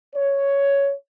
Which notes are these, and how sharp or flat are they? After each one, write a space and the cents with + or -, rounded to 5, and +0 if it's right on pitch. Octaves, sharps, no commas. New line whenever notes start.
C#5 +5